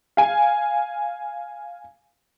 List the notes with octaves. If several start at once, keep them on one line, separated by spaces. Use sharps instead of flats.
F5 G#5